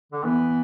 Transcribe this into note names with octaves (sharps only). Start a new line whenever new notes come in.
D3
E3 B3